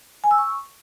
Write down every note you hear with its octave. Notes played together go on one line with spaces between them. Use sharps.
G#5
E6
C#6